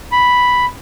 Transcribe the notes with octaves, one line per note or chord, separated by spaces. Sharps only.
B5